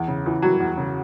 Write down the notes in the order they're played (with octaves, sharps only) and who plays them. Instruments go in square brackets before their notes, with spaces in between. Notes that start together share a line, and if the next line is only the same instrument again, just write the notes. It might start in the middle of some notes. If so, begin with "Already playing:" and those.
Already playing: [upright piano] E2
C#3
E3
[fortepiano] F#3 [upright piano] G3
[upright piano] E2
C#3